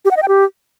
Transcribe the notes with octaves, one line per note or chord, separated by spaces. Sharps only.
G4
F#5
D#5
G5
G4